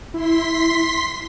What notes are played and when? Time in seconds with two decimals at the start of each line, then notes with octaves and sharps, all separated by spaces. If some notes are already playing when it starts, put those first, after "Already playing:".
0.14 E4 C6 B6